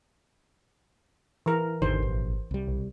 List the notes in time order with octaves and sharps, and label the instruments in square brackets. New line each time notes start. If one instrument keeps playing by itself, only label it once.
[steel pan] E3 A#4
[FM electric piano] G#1 [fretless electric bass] E2 D3 D#3 [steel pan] C5
[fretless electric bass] A#1
C2 G3
[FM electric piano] B1